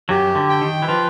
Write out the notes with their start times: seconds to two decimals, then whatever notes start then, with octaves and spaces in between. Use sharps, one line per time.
0.09 F#2 F#3 G4
0.35 D3
0.49 G5
0.61 D#3
0.82 E3
0.88 F3 B4